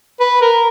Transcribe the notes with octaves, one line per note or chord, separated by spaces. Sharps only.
B4
A#4